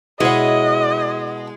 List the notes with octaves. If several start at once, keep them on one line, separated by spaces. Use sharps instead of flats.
B2 G#3 B3 E4 C#5 D#5